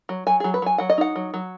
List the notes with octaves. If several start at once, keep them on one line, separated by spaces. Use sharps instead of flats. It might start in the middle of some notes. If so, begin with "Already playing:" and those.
F#3
F#3 G#5
F#3 G#4
B4
F#3 G#5
F#3 F#5
D#5
D#4 F#5
F#3
F#3